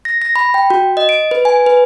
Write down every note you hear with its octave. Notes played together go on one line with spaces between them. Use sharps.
A#6
A#6
B5
G5
F#4
D#5
D7
B4
G#5
B4